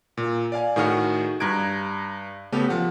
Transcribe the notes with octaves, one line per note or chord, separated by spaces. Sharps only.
A#2
D5 F5 G#5
A2 D#3 F#4 G#4 F#5 F6
G2 A#5 F#6 G#6 D7
C#3 A3 B3 G4 A4 B4
F3 F#5